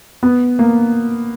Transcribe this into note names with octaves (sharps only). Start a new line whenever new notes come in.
B3
A#3